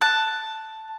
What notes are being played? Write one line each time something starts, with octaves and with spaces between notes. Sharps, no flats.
A5 F#6